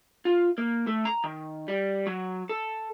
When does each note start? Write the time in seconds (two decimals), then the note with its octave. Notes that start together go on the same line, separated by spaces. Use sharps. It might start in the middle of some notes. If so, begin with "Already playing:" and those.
0.25 F4
0.58 A#3
0.87 A3
1.05 A#5
1.24 D#3
1.68 G3
2.07 F#3
2.49 A4